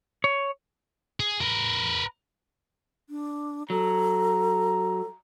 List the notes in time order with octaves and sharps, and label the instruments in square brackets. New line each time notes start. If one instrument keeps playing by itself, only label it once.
[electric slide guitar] C#5
[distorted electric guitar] G#4
A#4 B4
[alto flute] D4
[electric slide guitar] F#3 [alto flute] A4 [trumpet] A#5